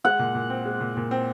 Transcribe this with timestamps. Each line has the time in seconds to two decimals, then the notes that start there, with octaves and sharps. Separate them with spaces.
0.04 G#3 F#5
0.19 A#2
0.35 A#2
0.50 C4
0.65 G#3
0.80 A#2
0.97 A#2
1.11 C4